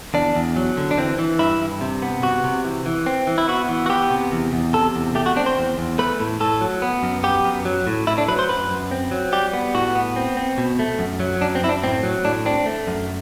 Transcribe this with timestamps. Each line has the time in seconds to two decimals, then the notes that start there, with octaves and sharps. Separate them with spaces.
0.14 E2 D4
0.35 E2
0.56 F#3
0.77 D3
0.91 D4
0.97 E3 C4
1.19 E3
1.39 G2 E4
1.61 G2
1.81 C3
2.02 B3
2.22 C3 F#4
2.44 C3
2.64 E3
2.86 E3
3.06 C4
3.27 E3
3.38 E4
3.48 B3 F#4
3.69 E3
3.86 F#4
3.89 B3 G4
4.11 C3
4.32 E2
4.53 E2
4.73 C3 A4
4.95 E2
5.15 A3 G4
5.26 F#4
5.36 C4 D4
5.46 C5
5.57 E2
5.78 E2
5.98 A3 B4
6.20 A2
6.40 A2 A4
6.61 F#3
6.82 B3
7.03 F#2
7.23 B3 G4
7.45 F#2
7.65 F#3
7.87 A2
8.07 A2 E4
8.18 D4
8.28 F#3 B4
8.39 C5
8.49 F#2 B4
8.70 F#2
8.91 C4
9.11 F#3
9.32 G3 G4
9.53 B3
9.74 A2 F#4
9.95 B3
10.16 C4
10.37 C4
10.58 B2
10.79 A3
10.99 F#2
11.20 F#3
11.41 F#2 D4
11.55 C4
11.62 F#2 E4
11.69 D4
11.83 A2 C4
12.03 F#3
12.25 A2 D4
12.46 C4 D4
12.66 A3
12.87 F#2